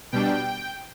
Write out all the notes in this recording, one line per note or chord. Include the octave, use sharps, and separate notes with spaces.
B2 G3 D4 G5